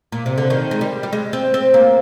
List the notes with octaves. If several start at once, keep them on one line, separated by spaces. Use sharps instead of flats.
A#2
C3
D3
D#3
G#3
G3
G3
G#3
C4
C4
A#3